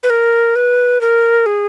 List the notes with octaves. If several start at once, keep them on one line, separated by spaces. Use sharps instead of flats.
B4
A#4
B4
A#4
G#4